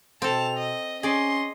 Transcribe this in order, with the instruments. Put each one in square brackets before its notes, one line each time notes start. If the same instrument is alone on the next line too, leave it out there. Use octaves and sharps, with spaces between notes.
[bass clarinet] B2 [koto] C4 A4 [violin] A5 F7
[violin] D#5
[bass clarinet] C#4 [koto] G#4 D5 [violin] D#5 C6